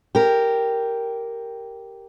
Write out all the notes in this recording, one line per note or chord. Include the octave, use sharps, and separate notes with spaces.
G4 A#4